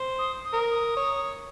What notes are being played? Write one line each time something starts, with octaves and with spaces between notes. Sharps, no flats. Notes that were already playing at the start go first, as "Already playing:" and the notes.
Already playing: C5
D#6
D#6
A#4
D#6
C#5